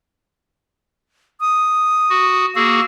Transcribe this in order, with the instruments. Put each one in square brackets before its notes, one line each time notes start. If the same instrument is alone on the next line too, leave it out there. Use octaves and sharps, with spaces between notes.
[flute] D#6
[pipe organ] F#4
[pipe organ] A#3 F#4 G#4 [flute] E6